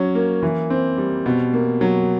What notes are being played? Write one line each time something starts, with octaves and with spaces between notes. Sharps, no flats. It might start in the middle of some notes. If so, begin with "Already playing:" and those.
Already playing: F#3 C#4
A#3
E3
C4
G3
B2
A#3
F#3